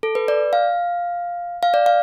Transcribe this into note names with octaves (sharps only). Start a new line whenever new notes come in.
A4
B4
D5
F5
F5
D5
F5